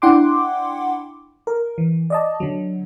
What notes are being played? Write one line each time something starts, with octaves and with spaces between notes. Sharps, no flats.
D4 E4 F#5 G5 C6 D6
A#4
E3
D5 D#5 A5
D3 F#3